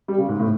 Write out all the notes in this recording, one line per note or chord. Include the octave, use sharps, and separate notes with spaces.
G3
C#3
G#2
A2